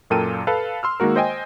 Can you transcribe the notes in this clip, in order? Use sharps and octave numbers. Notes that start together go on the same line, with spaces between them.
F#2 A#2 A4 A#4 G5 D#7
A4 B4 F5
C6 E6 F6
D#3 G#3 A#3 F#4 A#4
C5 D#5 G5 G#5